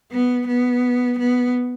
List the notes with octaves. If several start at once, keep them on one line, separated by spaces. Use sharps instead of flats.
B3
B3
B3